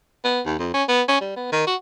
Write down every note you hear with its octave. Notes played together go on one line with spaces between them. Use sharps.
B3
D#2
F2
C#4
B3
C#4
G3
B3
D#3
F#4